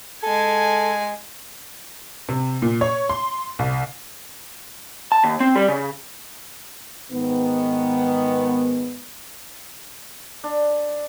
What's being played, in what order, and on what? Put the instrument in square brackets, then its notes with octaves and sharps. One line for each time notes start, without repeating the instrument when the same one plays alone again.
[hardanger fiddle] G#3 G#5 [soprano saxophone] A4
[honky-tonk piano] C3
A#2
C#5
C6
C2
[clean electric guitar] A5
D#2
C4
G3
C#3
[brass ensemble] G#2 D#3 B3
[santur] D4